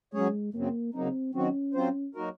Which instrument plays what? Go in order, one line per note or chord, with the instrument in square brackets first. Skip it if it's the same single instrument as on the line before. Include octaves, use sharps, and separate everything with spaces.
[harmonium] F#3 C#4 G#4 C#5 [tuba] G#3
[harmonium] F#2 C#3 F#3 C4 [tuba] A#3
[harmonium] C#3 F#3 A#3 D#4 [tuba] C4
[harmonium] D#3 F#3 C4 F#4 [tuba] C#4
[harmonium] F#3 C4 F4 C5
F#3 A#3 D#4 F#4 A#4